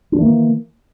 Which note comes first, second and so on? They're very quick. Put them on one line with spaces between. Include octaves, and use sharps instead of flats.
D4 D#3 E3 A#3